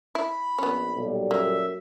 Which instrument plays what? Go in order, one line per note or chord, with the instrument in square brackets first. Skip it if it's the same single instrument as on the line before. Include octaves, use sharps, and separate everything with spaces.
[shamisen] E4 [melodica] B5
[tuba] A#1 [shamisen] B3 C#4
[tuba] B1 [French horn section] A#2 G3 A4
[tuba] F#2 [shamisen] A#3 [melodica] E5